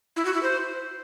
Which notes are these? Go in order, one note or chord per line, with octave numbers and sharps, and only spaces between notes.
E4
F#4
E4
C5